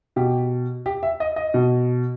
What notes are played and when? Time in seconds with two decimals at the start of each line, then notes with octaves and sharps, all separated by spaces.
0.16 B2 G4
0.86 G4
1.03 E5
1.20 D#5
1.36 D#5
1.54 B2